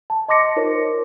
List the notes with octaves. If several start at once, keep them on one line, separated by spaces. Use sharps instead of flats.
A5
D#5 C6 D6 A#6 C#7
D#4 F4 A#4 C5 C#5